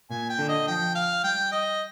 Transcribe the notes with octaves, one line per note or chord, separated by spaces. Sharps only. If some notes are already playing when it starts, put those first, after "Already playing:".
A#2 G#5
G5
D3
D#5
F3 G5
F5
G3 G5
D#5